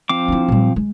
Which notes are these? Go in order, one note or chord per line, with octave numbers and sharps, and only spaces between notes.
F3 C4 D6
D4 E4
A#2 G3
G#3